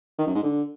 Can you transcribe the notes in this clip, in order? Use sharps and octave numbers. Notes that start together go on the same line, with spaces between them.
D#3
F#2
G#2
D3